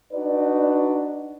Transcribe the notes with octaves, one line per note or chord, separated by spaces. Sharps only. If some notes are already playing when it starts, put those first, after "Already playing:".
D4 D#4 F#4 B4 D5